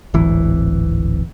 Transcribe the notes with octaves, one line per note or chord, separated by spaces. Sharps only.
D1 G#1 E3